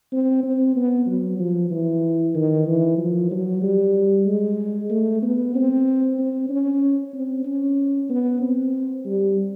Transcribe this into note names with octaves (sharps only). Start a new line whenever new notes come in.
C4
C4
B3
F#3
F3
E3
D#3
E3
F3
F#3
G3
G#3
A3
B3
C4
C4
C#4
C4
C#4
B3
C4
G3